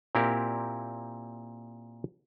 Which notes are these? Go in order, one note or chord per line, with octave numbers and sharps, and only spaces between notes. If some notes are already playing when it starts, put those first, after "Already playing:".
A#2 C4 E4 G4 A#4